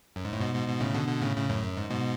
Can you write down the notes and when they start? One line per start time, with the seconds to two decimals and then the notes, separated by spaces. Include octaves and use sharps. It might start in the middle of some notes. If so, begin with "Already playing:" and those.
0.16 F#2
0.25 G#2
0.33 A2
0.40 G#2 B2
0.54 G#2 B2
0.68 G#2 B2
0.81 A2 C#3
0.95 B2 D3
1.08 B2 D3
1.22 A2 C#3
1.36 A2 C#3
1.49 F#2 A2
1.63 F#2
1.77 G#2
1.90 G#2 B2